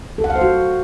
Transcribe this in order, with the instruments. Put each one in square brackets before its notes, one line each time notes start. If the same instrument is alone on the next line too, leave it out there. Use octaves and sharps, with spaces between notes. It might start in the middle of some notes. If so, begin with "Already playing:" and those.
[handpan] A4
F#5
F5
C5
F#4